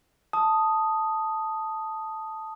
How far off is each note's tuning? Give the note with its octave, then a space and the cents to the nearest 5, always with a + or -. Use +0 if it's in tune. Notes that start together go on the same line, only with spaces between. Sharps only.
A5 +0 D#6 +0